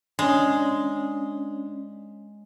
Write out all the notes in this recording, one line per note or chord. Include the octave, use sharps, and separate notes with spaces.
G#3 C#4 D4